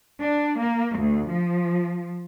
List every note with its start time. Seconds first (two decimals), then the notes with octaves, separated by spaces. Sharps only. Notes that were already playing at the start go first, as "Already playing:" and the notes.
0.21 D4
0.60 A#3
0.99 D2
1.31 F3